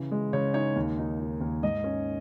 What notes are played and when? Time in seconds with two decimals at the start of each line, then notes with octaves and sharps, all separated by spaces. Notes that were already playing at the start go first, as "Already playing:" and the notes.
Already playing: C#3 E3
0.11 G#3
0.33 C#3 C#5
0.54 D#4 C#5
0.76 D#2
0.98 D#4
1.20 D#4
1.41 D#2
1.63 G#2 D#5
1.84 C#4